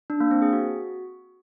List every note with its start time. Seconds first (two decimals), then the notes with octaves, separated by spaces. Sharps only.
0.10 D4
0.20 A#3
0.31 C4
0.42 G#4
0.53 F#4